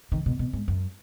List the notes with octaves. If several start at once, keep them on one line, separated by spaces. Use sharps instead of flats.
D#3
B2
B2
G#2
F#2